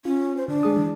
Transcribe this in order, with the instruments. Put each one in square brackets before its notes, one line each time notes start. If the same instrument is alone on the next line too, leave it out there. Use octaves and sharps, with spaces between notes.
[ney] C#4 [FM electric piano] F4
[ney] C5
[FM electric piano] D3 [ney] D4
[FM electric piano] G#3 G#4 D#6
E3